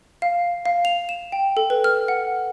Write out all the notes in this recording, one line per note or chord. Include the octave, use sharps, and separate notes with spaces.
F5
F5
F7
E7
G5
A4
B4
F6
F#5